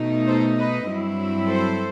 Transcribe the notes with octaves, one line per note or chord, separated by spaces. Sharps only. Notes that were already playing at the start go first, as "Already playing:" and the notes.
Already playing: B2 A3 D#4
A4 C5
B4 D#5
G2 F#3 C4 E4
A4 C5